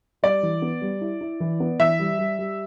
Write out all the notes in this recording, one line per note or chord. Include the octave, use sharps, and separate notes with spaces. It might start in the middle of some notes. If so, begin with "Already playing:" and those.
G3 D5
E3
B3
G3
E4
E4
E3
B3
E3 E5
G3
G3
G3